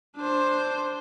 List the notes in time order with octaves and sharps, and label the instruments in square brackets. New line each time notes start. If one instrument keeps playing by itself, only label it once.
[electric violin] D4 C5